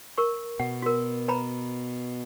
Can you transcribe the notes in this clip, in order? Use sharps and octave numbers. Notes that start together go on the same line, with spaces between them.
A#4 C#6
B2 F#5
F#4 A#4
B4 A#5 B5